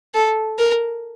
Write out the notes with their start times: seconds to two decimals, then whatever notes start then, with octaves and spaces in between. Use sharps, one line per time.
0.15 A4
0.58 A#4